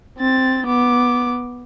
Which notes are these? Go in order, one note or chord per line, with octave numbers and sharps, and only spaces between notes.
C4 A6
B3 D6